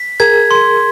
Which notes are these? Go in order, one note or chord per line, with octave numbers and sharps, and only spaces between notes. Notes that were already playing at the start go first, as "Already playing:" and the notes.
Already playing: B6
G#4 A#4 G#6
C6